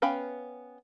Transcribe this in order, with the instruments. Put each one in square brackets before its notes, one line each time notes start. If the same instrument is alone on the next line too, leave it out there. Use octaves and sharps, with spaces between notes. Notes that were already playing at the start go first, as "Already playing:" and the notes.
[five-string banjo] B3 C#4 F5 G5 B5